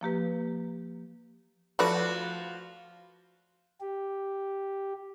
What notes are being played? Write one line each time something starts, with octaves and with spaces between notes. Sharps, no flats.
F3 A#3 G4 B4
F3 A3 F#4 B4 D5
G4